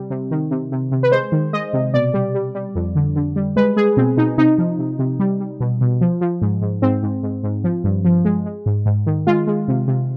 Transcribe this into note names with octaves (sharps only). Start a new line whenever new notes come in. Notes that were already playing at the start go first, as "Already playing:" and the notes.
Already playing: C3 G3
C3
D#3
C3
C3
C3
B4
G#3 C5
D#3
G#3 D#5
C3
B2 D5
G3
G3
G3
F2
D3
D3
G3
G#3 B4
G#3 G#4
B2 C4
B2 D#4
C3 D#4
F3
C3
C3
G3
G3
B2
B2
F3
F3
G#2
G#2
G#2 C4
G#2
G#2
G#2
F3
G2
F3
G#3
G#3
G#2
G#2
D#3
G#3 F4
G#3
C3
C3